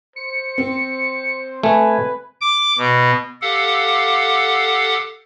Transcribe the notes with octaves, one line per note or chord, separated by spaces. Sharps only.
C5 C#7
C4
A3 B4 G#5
D6
B2
G4 A4 F5 F#5